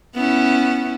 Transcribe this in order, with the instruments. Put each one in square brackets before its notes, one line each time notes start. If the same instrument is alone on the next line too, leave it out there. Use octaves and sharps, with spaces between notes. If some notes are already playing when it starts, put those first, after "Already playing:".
[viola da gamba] B3 C#4 E4